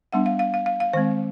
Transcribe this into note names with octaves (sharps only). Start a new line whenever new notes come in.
G3 B3 D4 F#5
F5
F5
F5
F5
F5
D#3 G#3 C4 C5